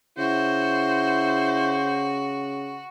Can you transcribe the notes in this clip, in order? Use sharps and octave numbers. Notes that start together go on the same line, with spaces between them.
C#3 E4 F#4 C5